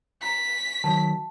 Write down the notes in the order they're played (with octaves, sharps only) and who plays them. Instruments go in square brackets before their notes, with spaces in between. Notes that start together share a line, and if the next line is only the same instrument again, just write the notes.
[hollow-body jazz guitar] A#5 [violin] B6
[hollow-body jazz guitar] D#3 F#3 [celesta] A5